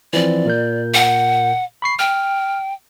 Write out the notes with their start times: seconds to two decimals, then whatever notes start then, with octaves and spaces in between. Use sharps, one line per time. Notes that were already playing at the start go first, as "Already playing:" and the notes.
0.13 E3 F3 C4 D5
0.45 A#2 A#4 G6
0.94 F#5
1.82 B5 C#6 C7
1.99 G5 F6